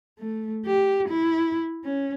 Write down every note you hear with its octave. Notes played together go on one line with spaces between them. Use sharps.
A3
G4
E4
C#4